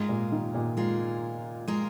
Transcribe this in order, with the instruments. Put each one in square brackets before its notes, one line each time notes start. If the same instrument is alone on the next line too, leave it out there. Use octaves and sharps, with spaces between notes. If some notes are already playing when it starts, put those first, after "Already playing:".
Already playing: [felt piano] G#2 [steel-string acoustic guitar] G#3 F4 A#4
[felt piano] A#2
D#3
A#2
[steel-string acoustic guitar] G#3 F4 A#4
G#3 F4 A#4